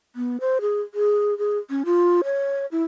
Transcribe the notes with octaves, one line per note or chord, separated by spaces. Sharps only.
B3
C5
G#4
G#4
G#4
C#4
F4
C#5
E4